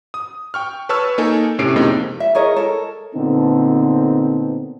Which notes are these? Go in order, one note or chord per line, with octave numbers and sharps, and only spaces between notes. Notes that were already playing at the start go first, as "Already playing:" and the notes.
D#6
G5 C#6 F6
B4 C#5 A5 C#6 E6 F6
A#3 D#4 A4 G#5
A2 C3 C#4 C7 D7
F2 C3 G#3 A#3 D#4
E5
G#4 A#4 C#5 D#5
A4 A#4
A#2 D3 B3 C4 D#4 A4